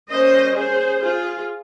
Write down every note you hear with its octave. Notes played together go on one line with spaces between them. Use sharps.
G3 A#3 C#4 C5 D#5
G#4 C5
F4 G#4